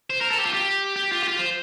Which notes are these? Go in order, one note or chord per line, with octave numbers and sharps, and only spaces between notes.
C5
A#4
A4
G4
F4
G4
G4
F4
G4
F4
C5